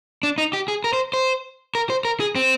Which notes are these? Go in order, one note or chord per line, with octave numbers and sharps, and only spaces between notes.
D4
D#4
G4
G#4
A#4
C5
C5
A#4
C5
A#4
G#4
C4